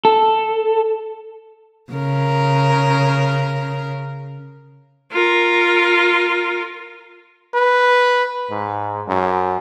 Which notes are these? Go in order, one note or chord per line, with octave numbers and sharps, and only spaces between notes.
A4
C#3 A#4
F4 A#4
B4
G#2
F#2